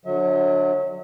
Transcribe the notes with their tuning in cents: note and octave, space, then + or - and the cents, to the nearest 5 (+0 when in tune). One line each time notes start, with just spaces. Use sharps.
D3 +0 F#3 -25 E5 -40